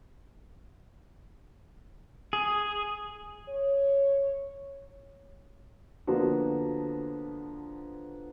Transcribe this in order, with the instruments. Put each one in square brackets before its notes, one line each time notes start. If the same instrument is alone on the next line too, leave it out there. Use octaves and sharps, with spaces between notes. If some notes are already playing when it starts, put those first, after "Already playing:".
[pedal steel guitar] G#4
[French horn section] C#5
[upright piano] D3 F3 A#3 B3 D4 F#4